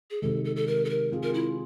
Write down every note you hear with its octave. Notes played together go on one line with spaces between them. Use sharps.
G#4
C3 D#3 G#3 A4
A4
A4
A#4
A4
A#4
C4 F4 G#4
A#4
E4